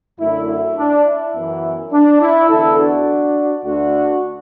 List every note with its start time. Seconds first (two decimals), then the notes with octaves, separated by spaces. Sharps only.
0.20 F#2 D3 A3 E4
0.49 E4
0.78 D4
1.05 E4
1.35 F#2 E3 B3
1.92 D4
2.21 E4
2.49 E2 D3 B3 E4 A4
2.78 D4 F#4
3.64 D2 D3 A3 D4 F#4